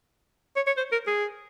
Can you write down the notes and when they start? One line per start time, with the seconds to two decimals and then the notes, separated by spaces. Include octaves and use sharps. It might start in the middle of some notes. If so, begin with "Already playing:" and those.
0.56 C#5
0.67 C#5
0.77 C5
0.92 A#4
1.07 G#4